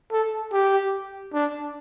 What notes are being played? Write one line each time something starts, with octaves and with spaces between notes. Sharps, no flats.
A4
G4
D4